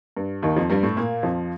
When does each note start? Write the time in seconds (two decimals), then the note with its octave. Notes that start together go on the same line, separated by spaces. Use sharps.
0.17 G2
0.43 D#2 D#3
0.56 F2 F3
0.70 G2 G3
0.83 A2 A3
0.97 A#2 A#3
1.23 F2 F3